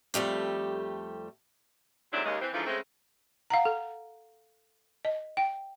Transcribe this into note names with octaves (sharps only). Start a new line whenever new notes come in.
F2 G3 A3 G4
G#2 C3 F#3 A3 D4 E4
D#2 C#3 G#3
E3 C4
G#2 D3 E3 F3
C#3 G#3 A3 C4
F5 F#5 A#5
A4
D#5
G5